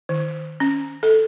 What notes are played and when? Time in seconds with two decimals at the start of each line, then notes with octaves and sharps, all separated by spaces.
0.09 D#3
0.60 C#4
1.03 A4